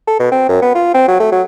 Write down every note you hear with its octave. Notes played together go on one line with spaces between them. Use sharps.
A4
B2
C4
F#2
B3
F4
C4
F#3
A3
F#3